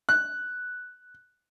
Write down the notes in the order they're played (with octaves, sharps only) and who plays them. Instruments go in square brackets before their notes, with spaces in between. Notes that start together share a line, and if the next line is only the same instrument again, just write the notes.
[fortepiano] F#6